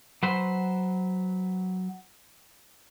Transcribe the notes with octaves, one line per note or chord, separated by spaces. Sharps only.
F#3 B4 C5